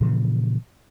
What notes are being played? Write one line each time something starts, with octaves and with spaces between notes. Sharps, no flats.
A#2 C#3 E3 F3